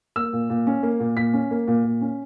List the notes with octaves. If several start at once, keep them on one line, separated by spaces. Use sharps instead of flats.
A#3 E6
A#2
A#2
C#4
A#3
A#2
A#2 B6
C#4
A#3
A#2
A#2
C#4